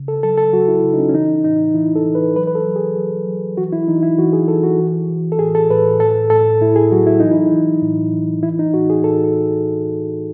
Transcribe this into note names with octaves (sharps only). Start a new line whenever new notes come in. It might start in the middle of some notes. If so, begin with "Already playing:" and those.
Already playing: C#3
A4
F#3 A4
A4
F#3 F#4
E4
C#3
D#4
C#4
C#4
E3 D#4
A2 D#4
E3 E4
A4
E3
B4
F#3 B4
B4
A4
F#3
G#4
F#3
F#3
E3 F#4
E4
E3 D#4
E4
E3 F#4
G#4
E3 A4
F#4
E3
E3
A4
A2 G#4
A4
A2 B4
A2 A4
A2 A4
A2 E4
G#4
F#3 F#4
E4
E3 D#4
E4
E3
A2
E3
E3 E4
D#4
A2 F#4
G#4
A2 A4
A4